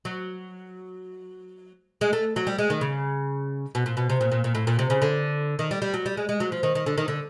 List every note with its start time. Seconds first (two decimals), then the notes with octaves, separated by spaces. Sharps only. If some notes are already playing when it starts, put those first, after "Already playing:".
0.05 F#3
2.01 G#3
2.13 A3
2.36 F#3
2.47 G3
2.59 G#3
2.70 D#3
2.81 C#3
3.75 B2
3.86 A#2
3.97 B2
4.10 C3
4.21 A#2
4.32 A#2
4.44 A#2
4.55 A2
4.67 A#2
4.79 C3
4.90 C#3
5.02 D3
5.59 D#3
5.71 G3
5.82 G3
5.94 F#3
6.06 G3
6.17 G#3
6.29 G#3
6.40 F#3
6.52 F3
6.63 D#3
6.75 D#3
6.86 D3
6.98 D#3
7.08 D3